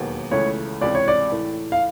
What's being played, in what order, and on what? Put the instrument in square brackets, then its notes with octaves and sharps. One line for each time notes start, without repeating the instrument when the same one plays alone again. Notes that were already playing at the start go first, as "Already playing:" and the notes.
Already playing: [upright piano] E1 D#2 D#3 F#3 B3
[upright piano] C#2 C#3 E3 A3 [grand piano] C#5
[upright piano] C#2 C3 E3 [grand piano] D5
[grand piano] C#5
D5
[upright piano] A2 E3 A3
[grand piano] F5